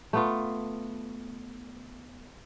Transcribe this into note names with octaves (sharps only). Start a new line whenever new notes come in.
A3 B3 F4